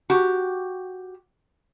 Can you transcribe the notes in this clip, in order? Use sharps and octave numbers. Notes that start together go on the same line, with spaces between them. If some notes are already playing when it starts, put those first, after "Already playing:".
F#4 G4